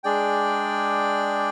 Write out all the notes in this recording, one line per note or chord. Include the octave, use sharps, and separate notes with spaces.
G#3 D4 G#4 D5 G5